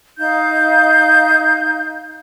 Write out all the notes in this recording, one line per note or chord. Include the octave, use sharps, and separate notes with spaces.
D#4 F5 G6